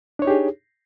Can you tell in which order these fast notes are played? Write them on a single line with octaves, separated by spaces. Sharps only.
D4 C#5 D#4 G4 G#4